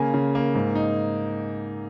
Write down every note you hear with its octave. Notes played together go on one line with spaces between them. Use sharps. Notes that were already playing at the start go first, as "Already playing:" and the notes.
Already playing: C#3 A#3 G#5
C#3
A#3
G#2
D#4